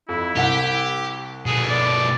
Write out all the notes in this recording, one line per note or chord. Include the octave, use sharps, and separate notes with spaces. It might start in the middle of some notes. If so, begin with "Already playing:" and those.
F2 E4
C2 G4 F#5
B2 A3 G#4
D5